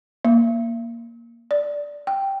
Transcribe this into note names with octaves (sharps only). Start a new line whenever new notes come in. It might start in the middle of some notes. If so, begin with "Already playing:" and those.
A#3
D5
G5